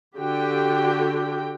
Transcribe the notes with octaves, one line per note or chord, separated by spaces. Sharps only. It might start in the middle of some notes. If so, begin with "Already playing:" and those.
D3 F#4 G4 G5